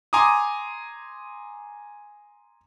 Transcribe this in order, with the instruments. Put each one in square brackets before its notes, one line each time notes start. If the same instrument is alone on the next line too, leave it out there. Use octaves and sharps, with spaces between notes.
[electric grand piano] G#5 A#5 C6 D6 D#6